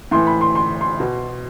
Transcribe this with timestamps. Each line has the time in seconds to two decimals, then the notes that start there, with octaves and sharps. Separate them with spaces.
0.11 A2 E3 C6
0.27 B5
0.41 C6
0.55 C6
0.81 C6
1.00 B2